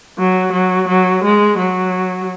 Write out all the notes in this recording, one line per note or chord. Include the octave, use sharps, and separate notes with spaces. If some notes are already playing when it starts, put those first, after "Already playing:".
F#3
F#3
F#3
G#3
F#3